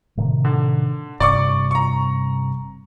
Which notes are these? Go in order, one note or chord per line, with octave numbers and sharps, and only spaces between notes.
A2 C3 D#3
D3
G1 G2 C3 D5 C#6 D6
A#5 C#6